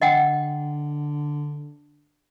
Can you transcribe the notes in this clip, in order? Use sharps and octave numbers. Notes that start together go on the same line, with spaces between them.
D3 D#5 F#5 G5